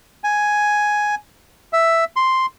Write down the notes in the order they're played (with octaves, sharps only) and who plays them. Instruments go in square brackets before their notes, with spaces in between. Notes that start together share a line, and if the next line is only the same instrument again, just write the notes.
[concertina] G#5
E5
C6